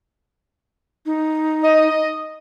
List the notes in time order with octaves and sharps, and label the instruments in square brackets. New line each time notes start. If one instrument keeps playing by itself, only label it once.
[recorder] D#4
[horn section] D#5